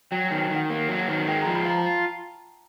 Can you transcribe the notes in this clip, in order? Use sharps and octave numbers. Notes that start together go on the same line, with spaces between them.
F#3 G5
D#3 G#5
G5
D#3 F#5
A#3
F#3
F#5
D#3
G#3 G5
F3 A#5
B5
F4 A#5
A5